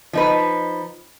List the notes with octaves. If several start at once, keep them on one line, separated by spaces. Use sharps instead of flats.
F3 D#4 B4